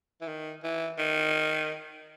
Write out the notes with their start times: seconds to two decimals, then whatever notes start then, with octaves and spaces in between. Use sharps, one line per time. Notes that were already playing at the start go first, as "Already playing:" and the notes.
0.21 E3
0.28 D#3
0.63 E3
0.98 D#3